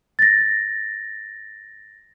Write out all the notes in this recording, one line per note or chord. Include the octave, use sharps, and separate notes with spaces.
A6 A#6